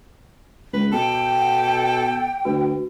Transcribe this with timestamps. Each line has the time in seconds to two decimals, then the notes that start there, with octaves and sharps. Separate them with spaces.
0.73 C#2 B4
0.92 B2 A4 G5
1.41 F#5
2.45 D2 F#4 B4